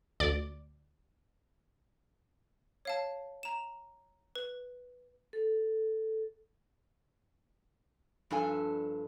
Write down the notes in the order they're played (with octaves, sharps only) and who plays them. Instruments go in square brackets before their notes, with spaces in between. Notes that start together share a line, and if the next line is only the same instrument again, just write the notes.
[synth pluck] D2 D5
[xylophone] C#5 F5 A5
A#5 E7
B4
[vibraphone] A4
[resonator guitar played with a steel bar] G2 F3 D4 A4 G#5